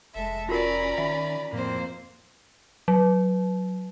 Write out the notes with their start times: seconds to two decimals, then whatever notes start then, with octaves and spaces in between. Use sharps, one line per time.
0.15 F1 G#3 A4 E5
0.49 C#4 F4 F#4 A#4 D5 A#5 B5
0.98 D#3 E5
1.53 F2 A2 A#3 C4 C5
2.88 F#3